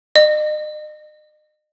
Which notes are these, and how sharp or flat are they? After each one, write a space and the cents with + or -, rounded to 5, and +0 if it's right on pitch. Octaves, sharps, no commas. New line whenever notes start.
D#5 -40